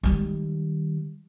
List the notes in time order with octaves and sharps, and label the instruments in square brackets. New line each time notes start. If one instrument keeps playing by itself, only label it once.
[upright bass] D#3 G3